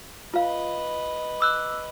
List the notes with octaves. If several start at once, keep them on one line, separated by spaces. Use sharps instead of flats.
F4 B4 D#5 F5
D6 E6 F#6